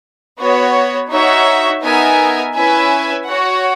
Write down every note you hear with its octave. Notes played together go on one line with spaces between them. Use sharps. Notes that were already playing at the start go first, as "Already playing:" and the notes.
B3 F#4 C#5
D#4 F#4 C#5 E5
B3 D#4 A#4 E5 G#5
C#4 E4 B4 E5 G#5
F#4 C#5 F#5